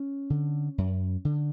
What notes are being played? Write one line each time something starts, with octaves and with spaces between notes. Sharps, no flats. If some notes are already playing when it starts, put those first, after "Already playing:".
Already playing: C#4
D3
F#2
D3